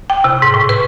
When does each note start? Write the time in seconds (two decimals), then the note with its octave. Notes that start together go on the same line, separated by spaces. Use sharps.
0.10 G5
0.24 C3
0.42 G#2
0.54 A2
0.69 B4